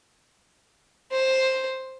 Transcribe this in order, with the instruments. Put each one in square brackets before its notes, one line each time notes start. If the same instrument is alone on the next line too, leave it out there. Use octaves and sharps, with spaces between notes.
[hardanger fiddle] C5